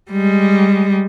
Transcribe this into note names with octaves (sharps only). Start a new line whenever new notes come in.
G3 G#3